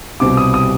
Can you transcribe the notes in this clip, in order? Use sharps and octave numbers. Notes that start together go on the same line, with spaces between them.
C2 B2 G3 C4 D6
D#6
D#6